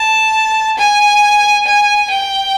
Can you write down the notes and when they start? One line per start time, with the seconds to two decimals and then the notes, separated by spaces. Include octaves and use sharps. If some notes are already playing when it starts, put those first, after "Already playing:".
Already playing: A5
0.78 G#5
1.66 G#5
2.10 G5